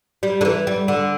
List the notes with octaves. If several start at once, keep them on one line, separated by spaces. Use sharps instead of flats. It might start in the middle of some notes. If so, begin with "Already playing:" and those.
G3
D3
E3
G3
D3